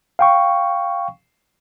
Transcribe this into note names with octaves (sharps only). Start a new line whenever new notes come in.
F5 G5 C#6